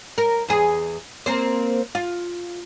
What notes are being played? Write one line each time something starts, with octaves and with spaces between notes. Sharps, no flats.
A#4
E2 G#4
A#3 C4 C5
F4